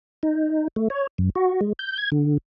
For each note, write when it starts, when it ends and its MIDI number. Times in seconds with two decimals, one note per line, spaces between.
0.23 0.68 63
0.76 0.88 57
0.90 1.07 73
1.18 1.30 42
1.35 1.61 66
1.61 1.73 56
1.79 1.98 91
1.98 2.10 92
2.12 2.38 50